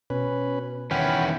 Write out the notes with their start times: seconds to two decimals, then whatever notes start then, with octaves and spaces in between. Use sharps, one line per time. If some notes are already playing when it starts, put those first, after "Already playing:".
0.10 B2 C#4 B4
0.91 E2 D#3 C#4 F#5 G5 B5